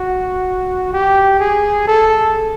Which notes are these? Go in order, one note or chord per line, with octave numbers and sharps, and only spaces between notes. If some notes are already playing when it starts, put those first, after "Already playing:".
Already playing: F#4
G4
G#4
A4